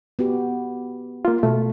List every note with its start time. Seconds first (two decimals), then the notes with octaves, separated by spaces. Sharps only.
0.19 B3 F#4 G4
1.25 A#3 F4
1.43 B2 A3